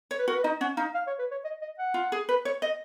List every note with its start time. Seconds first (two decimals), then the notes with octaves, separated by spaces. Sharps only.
0.11 C#5
0.19 B4
0.28 F#4 A#4
0.35 B4
0.44 D#4 D#5
0.61 C#4 F#5
0.77 D#4 F5
0.95 F5
1.07 C#5
1.19 B4
1.31 C#5
1.44 D#5
1.62 D#5
1.78 F#5
1.94 F4
2.12 G#4
2.29 B4
2.45 C#5
2.62 D#5